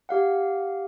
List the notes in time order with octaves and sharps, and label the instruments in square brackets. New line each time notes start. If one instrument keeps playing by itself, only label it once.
[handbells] G4 F5 F#5